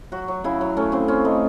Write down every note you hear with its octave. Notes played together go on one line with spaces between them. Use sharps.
F#3 F#4
F#3
C#3 E4
F#3
A3 C#4
C#3 C4
C4 C#4
A3 D#4